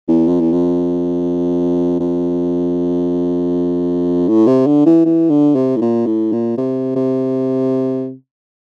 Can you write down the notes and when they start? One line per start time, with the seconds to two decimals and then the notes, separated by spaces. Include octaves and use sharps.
0.08 E2
0.28 F2
0.40 E2
0.53 F2
2.00 F2
4.28 A2
4.47 C3
4.67 D3
4.86 E3
5.05 E3
5.30 D3
5.55 C3
5.77 A2
5.81 A#2
6.07 A2
6.33 A#2
6.58 C3
6.96 C3